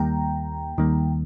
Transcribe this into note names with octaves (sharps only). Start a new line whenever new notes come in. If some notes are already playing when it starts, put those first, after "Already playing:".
Already playing: D#2 D#3 G3 A#3 G5 A#5
D#2 D#3 G3 A#3